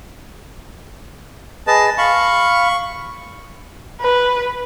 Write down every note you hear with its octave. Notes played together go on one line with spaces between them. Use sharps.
G#4 B4 D#5 A5
F5 B5 C#6
B4